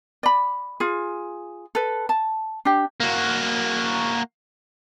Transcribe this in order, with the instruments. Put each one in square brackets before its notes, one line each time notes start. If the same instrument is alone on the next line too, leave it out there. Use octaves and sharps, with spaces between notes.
[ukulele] D5 B5
F4 G#4
A4 B4
A5
D4 G4
[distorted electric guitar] A#3 F#4